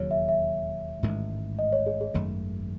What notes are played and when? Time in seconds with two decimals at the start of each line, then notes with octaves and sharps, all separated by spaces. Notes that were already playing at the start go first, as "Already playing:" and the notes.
Already playing: E1 D#2 C#3 F#3 C#5
0.11 E5
0.29 E5
1.03 A1 G#2 D#3 G#3
1.59 D#5
1.72 C#5
1.86 G#4
2.01 G#4
2.14 G#1 F#2 D#3 A3